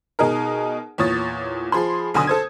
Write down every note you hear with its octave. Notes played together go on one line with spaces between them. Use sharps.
B2 D#4 G#4 A#4
E2 A#2 C#5 D#6 A6
F3 G#4 B5 C6
B1 D3 G#5 C6 D#6
A4 C5 G#6